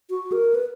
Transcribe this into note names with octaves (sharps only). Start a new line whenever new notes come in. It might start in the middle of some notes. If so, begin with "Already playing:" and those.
F#4
A#4
B4